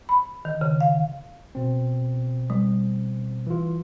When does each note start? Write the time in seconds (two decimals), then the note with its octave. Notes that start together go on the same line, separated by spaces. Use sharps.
0.09 B5
0.45 D#3
0.61 C#3
0.81 F5
1.55 B2 C4
2.50 G3
3.47 E3 F4